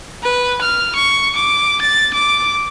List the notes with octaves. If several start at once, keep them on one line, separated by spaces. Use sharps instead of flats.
B4
F6
C#6
D6
A6
D6